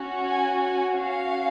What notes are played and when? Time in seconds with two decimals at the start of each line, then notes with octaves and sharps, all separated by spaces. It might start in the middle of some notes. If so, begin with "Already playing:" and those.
Already playing: C#4 F#4
0.28 G#5
0.64 G#5
1.00 C#4 F#4 F5